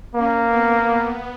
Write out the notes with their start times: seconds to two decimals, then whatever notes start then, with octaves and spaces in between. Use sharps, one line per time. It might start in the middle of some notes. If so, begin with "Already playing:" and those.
0.15 A#3 C#4
0.46 B3